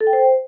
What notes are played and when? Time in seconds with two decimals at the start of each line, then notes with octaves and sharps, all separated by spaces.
0.01 A4
0.07 G5
0.13 C5